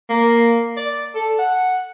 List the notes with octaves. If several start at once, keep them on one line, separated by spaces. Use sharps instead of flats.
A#3
D5
A4
F#5